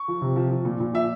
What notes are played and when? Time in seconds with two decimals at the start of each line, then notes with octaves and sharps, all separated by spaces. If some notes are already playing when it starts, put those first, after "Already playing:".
Already playing: C#6
0.08 F3
0.22 C3
0.36 F3
0.51 F3
0.65 A#2
0.80 A#2
0.94 F3 E5